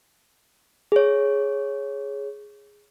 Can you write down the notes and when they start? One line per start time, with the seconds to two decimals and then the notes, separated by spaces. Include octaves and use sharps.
0.92 G#4 C#5